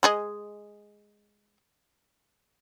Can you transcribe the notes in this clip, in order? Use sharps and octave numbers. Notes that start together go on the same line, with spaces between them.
G#3 G#4 D#5